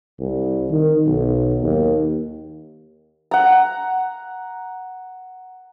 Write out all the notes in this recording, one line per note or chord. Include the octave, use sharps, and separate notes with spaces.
C2
D#3
B1
D#2
F#5 A#5